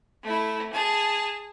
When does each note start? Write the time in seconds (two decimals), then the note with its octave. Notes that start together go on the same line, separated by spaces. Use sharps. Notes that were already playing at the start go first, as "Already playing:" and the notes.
0.24 A3 E4
0.73 G#4 A5